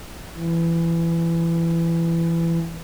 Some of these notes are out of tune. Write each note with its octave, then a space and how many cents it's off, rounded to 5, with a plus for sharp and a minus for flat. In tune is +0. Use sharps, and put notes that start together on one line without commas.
E3 +20